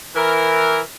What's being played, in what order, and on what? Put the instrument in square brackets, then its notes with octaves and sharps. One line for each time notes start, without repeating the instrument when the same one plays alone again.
[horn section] E3 A#4